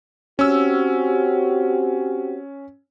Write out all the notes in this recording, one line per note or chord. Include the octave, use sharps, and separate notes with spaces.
C4 C#4 F#4 G4 E6